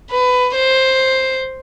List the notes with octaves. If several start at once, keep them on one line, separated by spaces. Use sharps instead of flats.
B4
C5